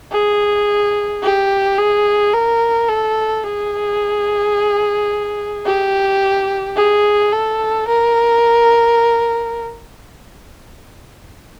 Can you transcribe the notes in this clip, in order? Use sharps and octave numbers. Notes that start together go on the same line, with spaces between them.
G#4
G4
G#4
A#4
A4
G#4
G4
G#4
A4
A#4